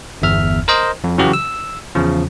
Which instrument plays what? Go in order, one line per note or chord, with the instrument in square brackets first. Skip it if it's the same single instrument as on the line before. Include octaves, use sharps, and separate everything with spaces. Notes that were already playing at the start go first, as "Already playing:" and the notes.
[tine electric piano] G1 E2 E5 F6
A#4 C5 D#5
F2
C#3 E3 F#3 F#4 G4
E6
E2 C#3 F3